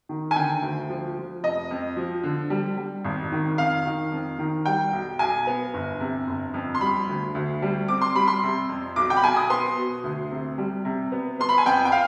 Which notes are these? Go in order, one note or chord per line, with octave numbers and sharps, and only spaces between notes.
D#3
G#5
D3 G5
D2
F3
F3
F1 D#5
F2
F3
D3
G3
G3
G#1
D#3
F2 F5
D#3
F2
D#3
G3 G5
B1
B1 G#5
B3
G1
C3
G1
F2
C6
G3 B5
D2
D2
G3
C4 D6
C6
G3 B5
C6
C3
F2
B1 D6
G5
B5
B1 G#5
D#6
B3 C6
B2
D2
C3
G3
C3
B3
B3 C6
B5
G#5
F2 G5
G5
F5